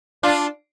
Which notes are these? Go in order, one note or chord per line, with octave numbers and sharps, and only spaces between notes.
D4 F4